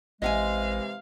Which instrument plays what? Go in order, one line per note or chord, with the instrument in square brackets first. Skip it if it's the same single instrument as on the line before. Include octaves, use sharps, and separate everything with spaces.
[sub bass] A1 [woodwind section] C3 E3 G#3 [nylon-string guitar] D#5 F#5 G#5 [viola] F5